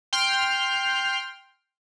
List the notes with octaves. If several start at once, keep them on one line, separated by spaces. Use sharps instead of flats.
G5 C6 F6